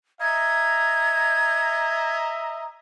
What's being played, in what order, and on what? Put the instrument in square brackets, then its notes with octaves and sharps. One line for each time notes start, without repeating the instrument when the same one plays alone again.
[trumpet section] D#5 E5 A#5 [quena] G#6